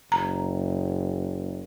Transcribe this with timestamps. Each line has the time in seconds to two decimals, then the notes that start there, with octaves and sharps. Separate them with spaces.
0.12 F#1 A#5